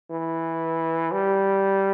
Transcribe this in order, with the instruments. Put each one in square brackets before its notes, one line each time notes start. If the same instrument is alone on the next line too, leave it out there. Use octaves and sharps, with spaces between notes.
[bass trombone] E3
G3